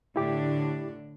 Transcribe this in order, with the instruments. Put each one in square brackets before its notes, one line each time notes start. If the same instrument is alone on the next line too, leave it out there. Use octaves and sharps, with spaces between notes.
[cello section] A2 D3 D4 [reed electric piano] E4 G4 D6